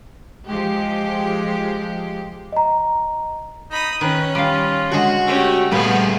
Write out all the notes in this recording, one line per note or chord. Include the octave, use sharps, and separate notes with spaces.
F3 G#3 G4
D#5 A#5
D#4 B5 D#6
D#3 C#4 B4
G3 F4 F5
D3 G#3 F#4 F#5
A3 C#4 G4
A#2 F3 G3 A3 B3 G#4 B4